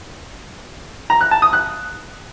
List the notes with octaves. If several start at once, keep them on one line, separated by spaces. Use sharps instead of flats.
A#5
F#6
A5
D#6
F#6